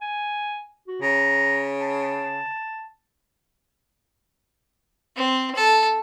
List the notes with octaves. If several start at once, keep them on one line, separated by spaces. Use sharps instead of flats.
G#5
F#4
C#3 A#5
A5
C4
A4